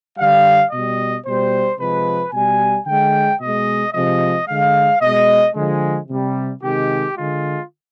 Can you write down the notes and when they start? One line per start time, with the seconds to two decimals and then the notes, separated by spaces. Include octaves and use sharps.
0.18 D3 G3 F5
0.71 B2 G3 D#5
1.25 B2 G3 C5
1.79 C3 F3 G#3 B4
2.32 B2 G3 G#5
2.87 D3 G#3 G5
3.40 B2 G#3 D#5
3.93 C3 F3 G#3 D#5
4.48 D3 G#3 F5
5.01 B2 G#3 D#5
5.55 D3 F3 G#3
6.08 C3 G3
6.62 C3 D#3 G#3 G4
7.16 D3 G#3 F4